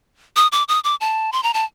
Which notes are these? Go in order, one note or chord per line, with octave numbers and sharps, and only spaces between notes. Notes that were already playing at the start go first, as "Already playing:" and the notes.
D#6
D6
D#6
D6
A5
C6
A#5
A5